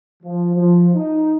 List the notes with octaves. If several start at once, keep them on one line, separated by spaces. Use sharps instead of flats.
F3
F3
D#4